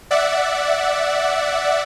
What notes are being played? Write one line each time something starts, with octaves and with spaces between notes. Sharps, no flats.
D5 E5 F#5